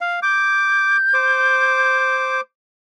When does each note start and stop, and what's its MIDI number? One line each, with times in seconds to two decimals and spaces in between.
0.01 0.20 77
0.23 0.97 86
0.23 2.37 91
1.14 2.41 72
1.14 2.41 86